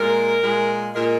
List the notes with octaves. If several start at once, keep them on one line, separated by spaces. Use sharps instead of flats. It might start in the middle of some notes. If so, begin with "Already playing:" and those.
Already playing: A#2 G#3 A#4
A#2 G#3
A#2 G#3 A#4